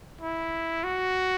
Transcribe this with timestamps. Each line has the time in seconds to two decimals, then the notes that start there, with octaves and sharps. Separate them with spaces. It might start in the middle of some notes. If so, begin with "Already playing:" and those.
0.21 E4
0.84 F#4